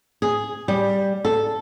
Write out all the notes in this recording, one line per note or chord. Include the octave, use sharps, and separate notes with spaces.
G#4
G3
A4